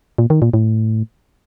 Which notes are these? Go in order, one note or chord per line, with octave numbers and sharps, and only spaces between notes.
A#2
D#3
A#2
A2